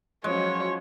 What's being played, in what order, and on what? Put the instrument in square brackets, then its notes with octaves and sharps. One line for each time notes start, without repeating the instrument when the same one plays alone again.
[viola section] F3 F#3 C#4 [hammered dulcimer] G#3 [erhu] C#5